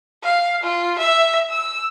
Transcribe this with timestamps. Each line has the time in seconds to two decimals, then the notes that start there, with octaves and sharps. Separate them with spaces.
0.23 F5
0.63 F4
0.99 E5
1.50 E6